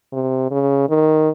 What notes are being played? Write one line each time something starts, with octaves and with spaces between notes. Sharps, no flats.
C3
C#3
D#3